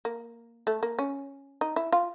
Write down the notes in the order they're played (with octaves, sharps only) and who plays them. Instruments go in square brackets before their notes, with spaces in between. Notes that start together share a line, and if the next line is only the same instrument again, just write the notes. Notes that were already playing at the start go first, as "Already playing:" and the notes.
[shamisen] A#3
A3
A#3
C#4
D#4
E4
F4